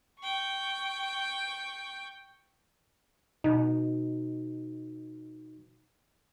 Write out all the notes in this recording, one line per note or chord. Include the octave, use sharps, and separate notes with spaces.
G5 C#6
B2 D#4